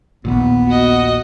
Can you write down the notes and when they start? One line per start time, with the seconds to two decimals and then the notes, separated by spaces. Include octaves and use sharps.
0.25 A#1 D#2 A#2 B3
0.68 F#4 D#5